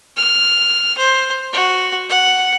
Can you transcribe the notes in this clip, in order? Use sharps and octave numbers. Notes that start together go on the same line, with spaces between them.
F6
C5
F#4
F#5